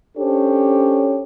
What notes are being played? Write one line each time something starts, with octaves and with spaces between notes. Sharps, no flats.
C#4 D4 G4 A4 C5 C#5